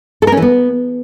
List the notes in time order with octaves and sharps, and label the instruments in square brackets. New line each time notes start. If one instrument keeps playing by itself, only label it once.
[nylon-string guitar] A4
A#4
C#4
E3
B3